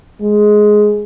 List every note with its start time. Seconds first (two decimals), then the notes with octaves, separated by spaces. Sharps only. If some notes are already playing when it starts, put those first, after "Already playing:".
0.21 G#3